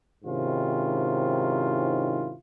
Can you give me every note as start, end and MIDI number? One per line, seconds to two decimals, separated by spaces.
0.25 2.35 44
0.25 2.35 48
0.25 2.35 51
0.25 2.35 61
0.25 2.35 64
0.25 2.35 65